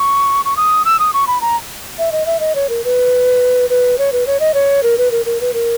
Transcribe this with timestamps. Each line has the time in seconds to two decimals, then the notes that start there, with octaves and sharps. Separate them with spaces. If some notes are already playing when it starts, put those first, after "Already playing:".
Already playing: C#6
0.45 C#6
0.57 D#6
0.85 E6
0.99 D#6
1.14 C#6
1.27 B5
1.41 A#5
1.98 E5
2.12 D#5
2.26 E5
2.40 D#5
2.55 C#5
2.69 A#4
2.84 B4
3.70 B4
3.98 C#5
4.13 B4
4.27 C#5
4.40 D#5
4.54 C#5
4.83 A#4
4.98 B4
5.11 A#4
5.26 A#4
5.41 B4
5.54 A#4